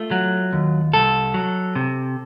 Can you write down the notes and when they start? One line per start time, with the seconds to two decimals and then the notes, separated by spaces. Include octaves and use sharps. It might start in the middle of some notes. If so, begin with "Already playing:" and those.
Already playing: A3 F4
0.11 F#3
0.53 D#2
0.94 C2 A4
1.34 F#3
1.75 C3